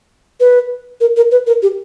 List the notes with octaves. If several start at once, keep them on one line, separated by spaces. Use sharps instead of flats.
B4
A#4
A#4
B4
A#4
G4